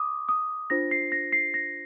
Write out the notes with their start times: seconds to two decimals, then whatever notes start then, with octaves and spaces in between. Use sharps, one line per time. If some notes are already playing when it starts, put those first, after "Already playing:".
Already playing: D6 D#6
0.29 D#6
0.70 D4 F4 C5 A#6
0.91 C7
1.12 A#6
1.33 C7
1.54 A#6